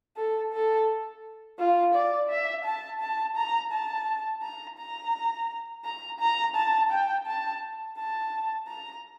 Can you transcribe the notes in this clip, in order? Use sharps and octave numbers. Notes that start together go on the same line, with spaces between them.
A4
A4
F4
D5
E5
A5
A5
A#5
A5
A#5
A#5
A#5
A#5
A5
G5
A5
A5
A#5